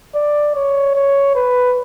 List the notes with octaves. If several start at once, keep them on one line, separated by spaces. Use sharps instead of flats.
D5
C#5
C#5
B4